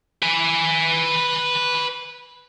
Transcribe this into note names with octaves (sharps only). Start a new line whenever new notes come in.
B4 G#5